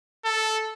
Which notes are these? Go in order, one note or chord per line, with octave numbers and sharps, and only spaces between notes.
A4